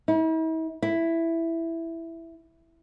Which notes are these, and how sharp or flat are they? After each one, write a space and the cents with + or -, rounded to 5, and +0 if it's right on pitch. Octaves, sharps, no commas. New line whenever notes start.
E4 -45
E4 +5